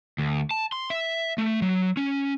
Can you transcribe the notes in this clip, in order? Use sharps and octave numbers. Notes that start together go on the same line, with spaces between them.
D2
A5
C6
E5
A3
F#3
C#4